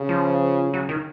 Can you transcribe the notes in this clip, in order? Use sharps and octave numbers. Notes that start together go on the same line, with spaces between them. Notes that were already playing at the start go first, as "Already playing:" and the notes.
Already playing: C#3
F3
F#3
D#3